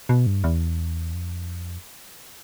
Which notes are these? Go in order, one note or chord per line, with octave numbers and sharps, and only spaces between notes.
B2
G2
E2
F2